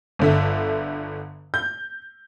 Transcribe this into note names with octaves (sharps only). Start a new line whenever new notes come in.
G1 D3 E5
G6